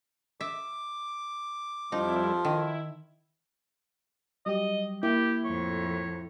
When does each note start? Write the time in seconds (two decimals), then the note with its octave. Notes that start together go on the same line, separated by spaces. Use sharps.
0.40 E5 D6
1.92 F2 F3 G3 D#4 E4
2.45 D#3 E4
4.46 F#3 G3 G4 D#5
5.03 A#3 E4 G4
5.45 F2 A2 C#5